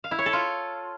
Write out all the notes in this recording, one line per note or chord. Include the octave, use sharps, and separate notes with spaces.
F5
E4
C#5
A4
F4